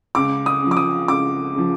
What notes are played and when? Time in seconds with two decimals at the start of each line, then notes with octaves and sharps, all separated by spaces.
0.15 C#2 D6
0.46 D#6
0.61 C#3
0.66 F3 D6
0.77 D#6
1.08 C#2 D6
1.54 C#3 F3